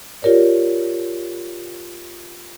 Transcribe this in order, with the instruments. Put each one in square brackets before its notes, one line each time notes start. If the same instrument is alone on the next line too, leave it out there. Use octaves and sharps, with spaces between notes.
[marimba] F4 G4 A#4 C#5 D5